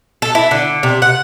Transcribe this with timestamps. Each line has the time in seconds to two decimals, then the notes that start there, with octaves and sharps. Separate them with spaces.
0.22 A4
0.35 E4
0.51 D3
0.83 C3
1.02 F#5